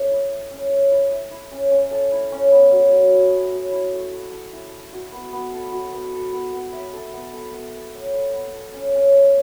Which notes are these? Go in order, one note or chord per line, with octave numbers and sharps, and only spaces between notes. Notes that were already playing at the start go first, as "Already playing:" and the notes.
Already playing: C#4 A4 C#5
E4
E5
C#4
C#5
E4
E5
E4
C#4
C#4
A4
E4
C#4
B3
F#3
F#3
E4
B3
F#3
E4
A3
A3
A4
E4
A3
F#4
B3
B3
A4
F#4
B3
A4
B3
B3
E5
A4
B3
A4
B3
B3
C#5
A4
B3
A4
C#4
C#4
E5